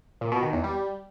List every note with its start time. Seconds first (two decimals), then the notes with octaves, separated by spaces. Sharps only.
0.21 A#2
0.32 B2
0.43 D#3
0.53 E2
0.64 G3